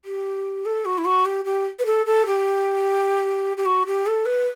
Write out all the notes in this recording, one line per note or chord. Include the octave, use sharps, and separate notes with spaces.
G4
A4
F#4
E4
F#4
G4
G4
B4
A4
A4
G4
G4
F#4
G4
A4
B4